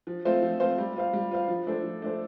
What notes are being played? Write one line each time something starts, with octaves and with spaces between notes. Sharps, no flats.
F3
A3 C4 F4 C5
F3
A3 C4 F4 C5
G3
F4 C5 F5
G3
F4 C5 F5
F3
A3 D4 A4 C5
F3
A3 D4 A4 C5